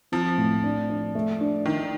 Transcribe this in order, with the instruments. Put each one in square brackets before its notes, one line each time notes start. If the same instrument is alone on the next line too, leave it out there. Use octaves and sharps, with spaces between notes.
[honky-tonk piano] F3 [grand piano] C4
[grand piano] A2
D4
D4
A3
D4
[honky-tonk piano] D#3 [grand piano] D4